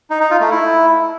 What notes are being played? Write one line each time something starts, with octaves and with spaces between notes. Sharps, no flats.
D#4
D#4
F4
A3
E4